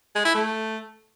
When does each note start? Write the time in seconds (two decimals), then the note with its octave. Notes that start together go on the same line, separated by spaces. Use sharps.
0.16 G#3
0.25 E4
0.35 A3